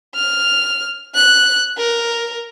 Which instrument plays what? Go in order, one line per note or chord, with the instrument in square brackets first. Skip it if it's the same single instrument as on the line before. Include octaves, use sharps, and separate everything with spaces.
[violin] F6
F#6
A#4